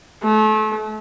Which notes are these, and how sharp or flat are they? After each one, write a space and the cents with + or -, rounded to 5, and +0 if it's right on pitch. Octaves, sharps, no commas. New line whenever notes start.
A3 -35